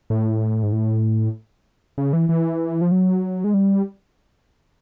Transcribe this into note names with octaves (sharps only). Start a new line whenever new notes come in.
A2
G#2
A2
C#3
E3
E3
F3
F#3
G#3
G3